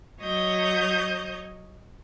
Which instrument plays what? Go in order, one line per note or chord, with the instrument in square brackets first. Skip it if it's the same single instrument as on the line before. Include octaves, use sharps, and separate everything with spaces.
[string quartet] F#3 C#5 D#5 G6